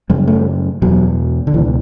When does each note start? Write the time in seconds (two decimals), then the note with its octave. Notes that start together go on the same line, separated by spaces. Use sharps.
0.10 F#2 C#3 G3
0.27 A3
0.82 E2 B2 F#3
1.47 D3
1.54 C#2 B2 E3